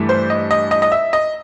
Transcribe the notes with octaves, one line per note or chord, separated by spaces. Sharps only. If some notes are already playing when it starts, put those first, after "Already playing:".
Already playing: G2 E3 A3
C5
D#5
D#5
D#5
D#5
E5
D#5